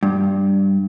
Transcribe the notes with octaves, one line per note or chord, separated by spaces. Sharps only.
G2